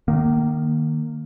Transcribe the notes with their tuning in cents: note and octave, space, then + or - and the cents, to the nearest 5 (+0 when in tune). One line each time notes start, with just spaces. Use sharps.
D#3 -25 A#3 +0